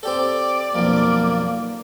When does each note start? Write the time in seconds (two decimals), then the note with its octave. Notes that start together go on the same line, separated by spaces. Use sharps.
0.03 C4 G4 A4 D5
0.75 B1 F2 A#3